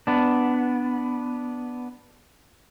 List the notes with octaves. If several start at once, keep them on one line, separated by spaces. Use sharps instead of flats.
B3 D4